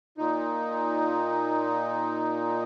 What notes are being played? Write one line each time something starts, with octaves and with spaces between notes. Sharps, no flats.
A#2 D#4